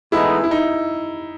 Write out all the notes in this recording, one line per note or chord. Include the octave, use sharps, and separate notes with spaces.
A2 E3 G#3 B3 D#4 E4
E4
D#4